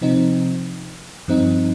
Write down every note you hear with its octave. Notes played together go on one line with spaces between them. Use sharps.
C3 F3 C4 D#4
G2 F3 C4 D#4